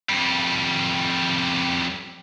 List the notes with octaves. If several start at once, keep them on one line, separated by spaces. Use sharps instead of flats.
F2 G3